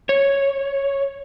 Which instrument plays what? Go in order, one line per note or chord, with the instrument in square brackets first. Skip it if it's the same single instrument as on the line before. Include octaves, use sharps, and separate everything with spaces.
[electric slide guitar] C#5